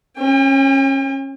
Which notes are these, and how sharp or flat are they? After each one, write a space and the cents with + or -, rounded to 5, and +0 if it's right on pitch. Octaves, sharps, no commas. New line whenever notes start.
C#4 -25 G5 +45